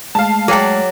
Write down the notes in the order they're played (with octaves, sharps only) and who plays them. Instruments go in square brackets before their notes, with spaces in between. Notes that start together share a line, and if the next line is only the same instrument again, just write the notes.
[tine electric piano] G#3 A3 F6 [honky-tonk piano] F5 A5
[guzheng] F#3 D5 [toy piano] G#4 G5